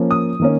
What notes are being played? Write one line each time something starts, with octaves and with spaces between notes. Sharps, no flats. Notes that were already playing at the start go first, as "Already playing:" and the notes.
Already playing: F3 A#3 C#4
D#6
D#3 A#3 C#4